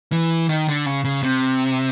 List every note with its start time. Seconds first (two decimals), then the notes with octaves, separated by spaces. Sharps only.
0.12 E3
0.49 D#3
0.68 D3
0.86 C#3
1.05 C#3
1.23 C3